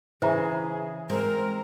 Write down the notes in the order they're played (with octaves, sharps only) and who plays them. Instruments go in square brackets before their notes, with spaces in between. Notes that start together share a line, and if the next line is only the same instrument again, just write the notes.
[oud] C#3 [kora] E3 [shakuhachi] G#4 [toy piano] C5 E5 A#5
[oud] G#3 C4 [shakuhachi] A#4